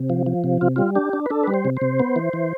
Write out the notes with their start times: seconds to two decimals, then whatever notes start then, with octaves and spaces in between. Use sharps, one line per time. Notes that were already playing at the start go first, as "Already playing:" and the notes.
Already playing: C3
0.10 F3
0.26 F3
0.44 C3
0.61 C3 F4
0.76 G3 F4
0.95 D4 G4
1.13 D4
1.26 B4
1.30 D4 A4
1.43 G3 B4
1.54 C5
1.65 C3
1.77 C3 C5
2.00 B3
2.16 E3
2.33 E3